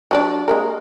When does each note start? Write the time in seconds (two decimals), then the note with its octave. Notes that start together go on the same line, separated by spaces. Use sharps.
0.11 F#3 D4 D5
0.48 G#3 A#3 A#4